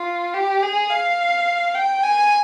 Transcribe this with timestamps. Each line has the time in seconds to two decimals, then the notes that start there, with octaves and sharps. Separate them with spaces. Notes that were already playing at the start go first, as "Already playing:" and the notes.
Already playing: F4
0.34 G4
0.63 G#4
0.90 F5
1.75 G5
2.03 G#5